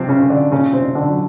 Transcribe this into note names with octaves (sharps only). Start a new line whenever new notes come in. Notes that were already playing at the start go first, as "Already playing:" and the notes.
Already playing: C3 F3 C4
C#3 C#4
C#3
D3 D4
A#2 C#3 C#4
C3 C4
A#2
D3 D4
F#3